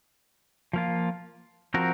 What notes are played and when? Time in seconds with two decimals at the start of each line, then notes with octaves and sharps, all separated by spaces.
0.73 F3 A#3 F4
1.74 F3 C4 F#4 A#4